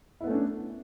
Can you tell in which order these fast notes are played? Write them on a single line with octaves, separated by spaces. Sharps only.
E4 B3 A3 C#4 D4